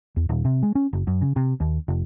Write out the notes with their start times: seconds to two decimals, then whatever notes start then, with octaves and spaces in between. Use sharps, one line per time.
0.16 E2
0.29 D#1
0.45 C3
0.63 G#3
0.75 C#4
0.93 F#1
1.07 F#2
1.21 C#3
1.36 C3
1.60 D#2
1.88 F1